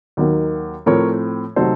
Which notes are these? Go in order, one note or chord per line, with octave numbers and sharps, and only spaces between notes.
D#2 D#3 F#3 A#3
A2 F3 C4 A#4 C#5
C3 F#3 A3 D#4 A4 C5